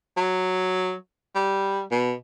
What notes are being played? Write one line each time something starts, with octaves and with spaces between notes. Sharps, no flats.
F#3
G3
B2